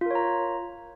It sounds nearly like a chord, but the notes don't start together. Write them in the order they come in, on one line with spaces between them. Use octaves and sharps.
F4 A#4 C#5 A#5